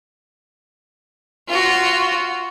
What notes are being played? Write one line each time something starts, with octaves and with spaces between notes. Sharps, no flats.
F4 F#4